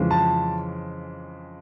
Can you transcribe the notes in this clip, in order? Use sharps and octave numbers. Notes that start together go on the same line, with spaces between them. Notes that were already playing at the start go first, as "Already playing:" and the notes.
Already playing: F2 C#3 E3 G#3
A5